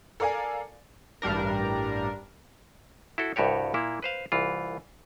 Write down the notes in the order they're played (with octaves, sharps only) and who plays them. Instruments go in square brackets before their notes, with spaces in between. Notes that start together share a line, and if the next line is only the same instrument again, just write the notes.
[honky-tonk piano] A4 A#4 D5 F5 G#5
[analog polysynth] A1 G2 G3 D4 A#4
[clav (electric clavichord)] E4 F#4 A4
C2 G2 F#4 G4 C#5
A#2 A#3 E4
B4 C5 F5
C2 E3 F4